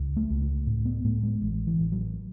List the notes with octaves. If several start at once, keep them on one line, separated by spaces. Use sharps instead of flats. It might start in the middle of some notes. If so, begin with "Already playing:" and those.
Already playing: C#2 C#3
A3
C#2
A3
A2
B3
A2 A3
G#3
A1 G#3
E3
A1
F#3